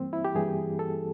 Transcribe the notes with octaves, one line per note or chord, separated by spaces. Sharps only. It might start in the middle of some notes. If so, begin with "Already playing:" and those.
Already playing: G2 E3 G3 A#3 C4
E4
G4
G2 E3 G3 G#4
A4